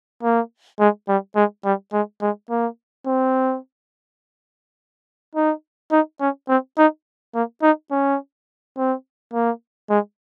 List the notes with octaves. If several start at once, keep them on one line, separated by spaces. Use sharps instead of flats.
A#3
G#3
G3
G#3
G3
G#3
G#3
A#3
C4
D#4
D#4
C#4
C4
D#4
A#3
D#4
C#4
C4
A#3
G#3